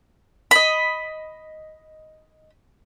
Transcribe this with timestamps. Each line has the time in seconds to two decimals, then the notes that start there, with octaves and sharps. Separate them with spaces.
0.51 D#5 B5